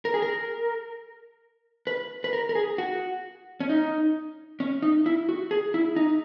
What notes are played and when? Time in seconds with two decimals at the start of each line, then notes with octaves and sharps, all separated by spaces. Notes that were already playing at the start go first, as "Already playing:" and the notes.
0.05 A#4
0.14 G#4
0.22 A#4
1.87 B4
2.24 B4
2.33 A#4
2.49 A#4
2.55 G#4
2.78 F#4
3.60 C#4
3.69 D#4
4.60 C#4
4.82 D#4
5.06 E4
5.29 F#4
5.51 G#4
5.74 E4
5.96 D#4